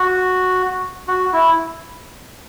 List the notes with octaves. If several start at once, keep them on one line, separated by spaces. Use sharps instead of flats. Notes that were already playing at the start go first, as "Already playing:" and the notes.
Already playing: F#4
F#4
E4